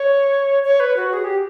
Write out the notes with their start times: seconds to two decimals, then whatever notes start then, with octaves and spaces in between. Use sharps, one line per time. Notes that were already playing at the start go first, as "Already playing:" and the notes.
Already playing: C#5
0.63 C#5
0.80 B4
0.97 F#4
1.13 G#4
1.24 G4